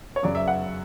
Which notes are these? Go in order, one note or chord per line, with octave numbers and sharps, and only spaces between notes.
C#5
F#2 C#3 F#3 D5
E5
F#5